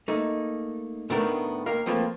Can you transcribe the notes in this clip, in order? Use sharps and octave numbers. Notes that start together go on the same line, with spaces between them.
A3 A#3 D#4
A2 D#3 A3 B3 D4 A#4
D#2 A#4 F5
F3 A3 A#3 C4 F4 B4